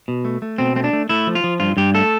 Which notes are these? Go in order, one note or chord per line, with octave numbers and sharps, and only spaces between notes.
B2
A3
A3
B2 C4
A3 C4
D4
A3
A3 E4
F3
F4
F3
G2 F4
G2 G4
A3 A4